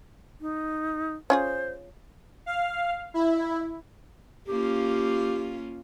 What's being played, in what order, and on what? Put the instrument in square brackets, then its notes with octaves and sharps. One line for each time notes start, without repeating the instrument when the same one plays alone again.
[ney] D#4
[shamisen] C#4 F4 G#4 [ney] C5
[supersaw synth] F5
E4
[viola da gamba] A#3 C#4 F4 [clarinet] G4